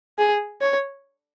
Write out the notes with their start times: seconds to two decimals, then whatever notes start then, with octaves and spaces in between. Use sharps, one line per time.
0.18 G#4
0.62 C#5